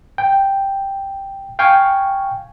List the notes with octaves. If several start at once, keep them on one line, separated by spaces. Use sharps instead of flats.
G5
F5 G5 G#5 C#6